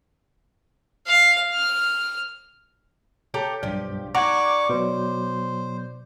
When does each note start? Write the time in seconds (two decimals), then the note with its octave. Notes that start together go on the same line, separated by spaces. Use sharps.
1.07 F5
1.54 F6
3.34 G4 A4 C#5 A#5
3.63 B1 G2 F3 G4 D5
4.15 D#4 D5 F#5 A#5 C#6 D6 F#6 G#6
4.69 B2 F#3 B4 C5